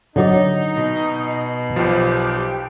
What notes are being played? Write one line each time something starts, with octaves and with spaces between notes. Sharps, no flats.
D3 F#3 D#4 D5
B2
B1 F3 G4